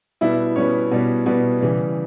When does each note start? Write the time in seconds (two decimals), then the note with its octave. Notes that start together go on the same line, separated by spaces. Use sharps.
0.21 B2 G3 B3 E4 E5
0.56 B2 G3 B3 C#4 C#5
0.91 B2 G3 B3
1.26 B2 G3 B3
1.61 C#3 E3 G3